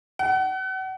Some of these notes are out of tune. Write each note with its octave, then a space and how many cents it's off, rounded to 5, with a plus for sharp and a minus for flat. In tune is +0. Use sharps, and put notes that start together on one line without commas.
F#5 +35